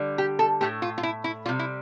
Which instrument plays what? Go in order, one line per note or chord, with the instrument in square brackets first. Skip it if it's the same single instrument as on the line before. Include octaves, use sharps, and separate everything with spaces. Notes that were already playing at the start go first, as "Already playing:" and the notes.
Already playing: [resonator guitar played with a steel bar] D3 G3
G4
A4
A2 F3 A3 G4
F4
F4
E4
E4
G3 F4
C3
E4